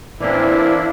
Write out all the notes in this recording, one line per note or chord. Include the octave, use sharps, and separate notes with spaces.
E3 A#3 C4 D4 E4